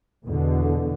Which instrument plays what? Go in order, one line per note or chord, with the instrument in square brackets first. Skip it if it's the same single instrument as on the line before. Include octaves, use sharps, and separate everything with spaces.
[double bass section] E2 B2 D3